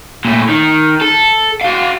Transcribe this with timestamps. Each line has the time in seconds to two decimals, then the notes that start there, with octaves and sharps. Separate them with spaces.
0.25 A#2 A3
0.49 D#3
1.02 A4
1.61 F#4 F5